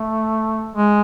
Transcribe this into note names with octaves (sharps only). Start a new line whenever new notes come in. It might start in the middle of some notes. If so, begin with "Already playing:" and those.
Already playing: A3
G#3